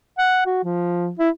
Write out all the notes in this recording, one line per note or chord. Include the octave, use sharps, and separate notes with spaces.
F#5
F#4
F3
E4